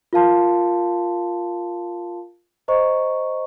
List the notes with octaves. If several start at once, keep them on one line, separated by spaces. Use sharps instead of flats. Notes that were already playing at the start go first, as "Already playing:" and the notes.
F4 A#4 F5 A5 C6
C5 D#5 A#5 C#6